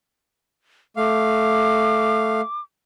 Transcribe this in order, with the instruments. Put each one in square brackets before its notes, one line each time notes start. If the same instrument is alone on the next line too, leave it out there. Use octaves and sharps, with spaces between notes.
[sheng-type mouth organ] A3 F5 [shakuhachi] D6